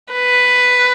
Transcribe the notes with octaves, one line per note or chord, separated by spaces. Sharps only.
B4